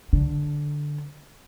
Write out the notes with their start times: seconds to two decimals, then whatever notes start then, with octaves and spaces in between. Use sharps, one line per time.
0.13 D3